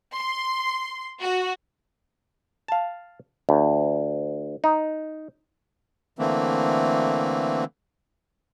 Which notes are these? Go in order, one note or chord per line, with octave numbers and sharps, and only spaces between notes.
C6
F#4
F5 A5
D2
D#4
D3 E3 A3 A#3 C4